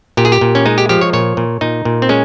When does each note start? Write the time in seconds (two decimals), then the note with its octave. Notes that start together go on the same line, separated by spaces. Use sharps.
0.17 A#2 G4
0.25 G#4
0.32 G4
0.41 A#2
0.55 C#4
0.66 G#3 D#4
0.78 G4
0.89 F3 G4
1.01 C#5
1.13 A#2 C#5
1.37 A#2
1.61 A#2 D#4
1.85 A#2
2.02 C4
2.09 G#3 C#4